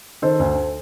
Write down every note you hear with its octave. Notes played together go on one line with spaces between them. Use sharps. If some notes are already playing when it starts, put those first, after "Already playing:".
D#3 A4 C5
D2